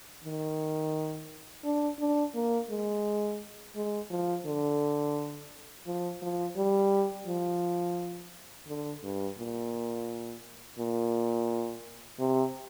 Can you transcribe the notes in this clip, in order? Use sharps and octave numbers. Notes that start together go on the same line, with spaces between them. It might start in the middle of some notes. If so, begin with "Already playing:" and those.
D#3
D4
D4
A#3
G#3
G#3
F3
D3
F3
F3
G3
F3
D3
G2
A#2
A#2
C3